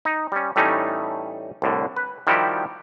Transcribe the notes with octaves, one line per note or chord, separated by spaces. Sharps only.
D#4
G3 C#4
A2 E3 G3 A3 C#4 D#4
C2 A2 D3
B4
D#3 F3 G3 E4 F#4 G4